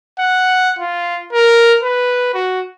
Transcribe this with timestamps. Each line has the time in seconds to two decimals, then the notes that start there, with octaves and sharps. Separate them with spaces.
0.19 F#5
0.79 F4
1.33 A#4
1.83 B4
2.34 F#4